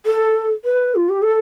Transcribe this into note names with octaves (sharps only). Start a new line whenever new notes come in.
A4
B4
F4
G4
A4